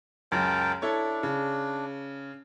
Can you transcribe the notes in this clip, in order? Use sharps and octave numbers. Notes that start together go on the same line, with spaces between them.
C#2 F#2 A#4 G5 A5
D4 E4 A4 C#5
C#3